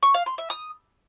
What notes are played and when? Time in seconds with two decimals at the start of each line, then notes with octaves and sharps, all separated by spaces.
0.03 C#6
0.14 F5
0.26 C6
0.38 E5
0.50 D#6